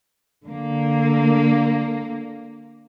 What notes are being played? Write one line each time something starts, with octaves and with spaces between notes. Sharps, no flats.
D3 A#3